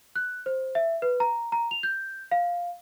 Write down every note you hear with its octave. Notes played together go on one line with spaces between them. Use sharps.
F#6
C5
E5
B4
A#5
A#5
F7
G6
F5